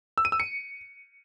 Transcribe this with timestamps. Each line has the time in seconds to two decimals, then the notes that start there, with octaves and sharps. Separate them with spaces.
0.18 E6
0.25 D#7
0.32 E6
0.40 C#7